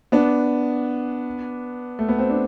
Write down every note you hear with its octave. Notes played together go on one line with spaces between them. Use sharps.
B3 D4
A3
B3
C4
D4